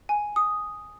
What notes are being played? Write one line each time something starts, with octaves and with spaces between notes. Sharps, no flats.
G#5
D#6